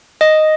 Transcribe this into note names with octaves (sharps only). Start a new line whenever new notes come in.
D#5